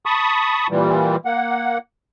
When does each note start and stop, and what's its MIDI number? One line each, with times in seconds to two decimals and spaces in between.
0.06 0.67 81
0.06 0.67 83
0.06 0.67 85
0.06 0.67 87
0.70 1.16 46
0.70 1.16 52
0.70 1.16 55
1.25 1.78 58
1.25 1.78 78